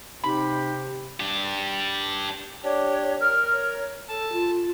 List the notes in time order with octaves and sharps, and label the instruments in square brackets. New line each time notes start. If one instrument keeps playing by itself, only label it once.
[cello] C3 [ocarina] D#4 [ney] G4 [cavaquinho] B5
[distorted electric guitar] D4 G4
[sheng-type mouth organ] D4 G4 [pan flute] C#5
[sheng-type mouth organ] A#4 [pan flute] F6
[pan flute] C#5
[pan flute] A4 [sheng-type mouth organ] A5
[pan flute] F4